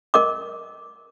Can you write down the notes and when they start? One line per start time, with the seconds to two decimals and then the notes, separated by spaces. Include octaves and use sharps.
0.14 A#4 D#5 D6